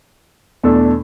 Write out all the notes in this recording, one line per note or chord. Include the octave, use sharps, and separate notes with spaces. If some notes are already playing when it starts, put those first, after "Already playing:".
E2 B2 A3 D4 A4